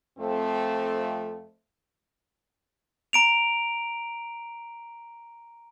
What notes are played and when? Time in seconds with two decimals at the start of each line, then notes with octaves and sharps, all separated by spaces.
0.19 F2 A3 C4
3.13 A#5 D7 F7